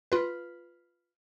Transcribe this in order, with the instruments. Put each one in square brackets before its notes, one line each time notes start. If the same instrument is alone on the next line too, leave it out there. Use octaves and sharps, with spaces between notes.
[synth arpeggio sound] F4 B4